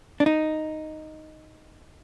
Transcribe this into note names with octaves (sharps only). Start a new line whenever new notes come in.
D4
D#4